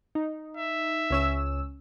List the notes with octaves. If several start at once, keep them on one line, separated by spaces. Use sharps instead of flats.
D#4
E5
C#2 C#4 E6